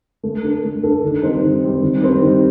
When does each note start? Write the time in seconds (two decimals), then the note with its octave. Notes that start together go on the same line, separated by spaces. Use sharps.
0.23 A3
0.43 D4 A4
0.63 A3
0.83 D4 A4
1.02 D#3
1.23 G3 C4 D#4
1.43 D#3
1.62 G3 C4 D#4
1.82 D#3
2.01 G3 C4
2.22 D#3